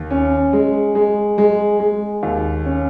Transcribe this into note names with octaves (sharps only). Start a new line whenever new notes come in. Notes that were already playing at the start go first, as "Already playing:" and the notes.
Already playing: D#2
C#4
G#3
G#3
G#3
G#3
D#2
C#4